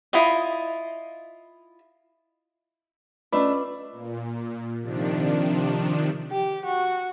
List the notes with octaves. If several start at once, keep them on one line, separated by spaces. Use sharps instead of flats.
E4 F4 D#5
A3 C#4 D4 F4 B4 D#5 B5 D6
A#2
C3 D#3 F3 D4
G4
F#4